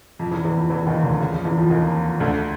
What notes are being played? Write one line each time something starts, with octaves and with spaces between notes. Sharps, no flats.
F2 F3
E2 E3
E2 E3
F2 F3
E2 E3
D#2 D#3
D2 D3
C#2 C#3
F2 F3
E2 E3
F2 F3
D#2 D#3
D2 D3